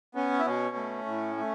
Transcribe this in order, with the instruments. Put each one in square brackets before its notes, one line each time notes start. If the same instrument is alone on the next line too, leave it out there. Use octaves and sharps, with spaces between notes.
[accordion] B3 C#4
E4
B2 C#4
A3
A2
A3